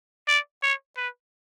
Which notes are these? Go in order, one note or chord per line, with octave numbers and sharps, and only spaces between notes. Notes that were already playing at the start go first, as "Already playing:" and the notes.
D5
C#5
B4